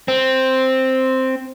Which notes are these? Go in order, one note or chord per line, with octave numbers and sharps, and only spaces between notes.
C4